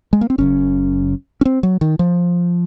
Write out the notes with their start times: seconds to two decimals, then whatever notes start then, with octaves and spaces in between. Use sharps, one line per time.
0.13 G#3
0.21 A#3
0.30 C4
0.38 F#1 F#2 C#3 C#4
1.41 C#4
1.45 C4
1.63 F#3
1.81 D#3
1.99 F3